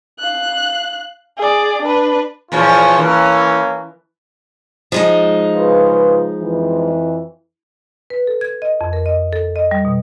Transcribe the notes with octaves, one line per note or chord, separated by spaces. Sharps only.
F5 F#6
G#4 D5
D4 B4
E2 A#2 F3 F4 C#5 G#5
E3 A#3 C#4
F3 G#3 D#4
C#3 F4 B4
F2 E3
B4
A4
G#6
D#5
F2
A#4
D#5
A4
D#5
G3
B2